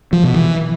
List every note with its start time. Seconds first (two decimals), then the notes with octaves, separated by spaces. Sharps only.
0.13 F3
0.24 B2
0.35 E3